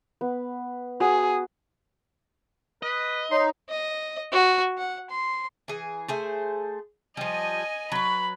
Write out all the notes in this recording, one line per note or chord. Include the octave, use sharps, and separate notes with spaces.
B3
F#4 G#4
B4 D#5
D#4 C#5 C6
D#5
F#4
F#5
C6
E3 G#4
A3 G#4 C5
F3 G3 D#5 G#5
F#3 B4 B5